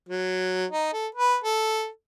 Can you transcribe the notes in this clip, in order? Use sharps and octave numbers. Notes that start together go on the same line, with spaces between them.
F#3
D#4
A4
B4
A4